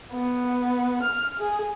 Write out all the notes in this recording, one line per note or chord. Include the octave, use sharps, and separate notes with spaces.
B3
F6
G#4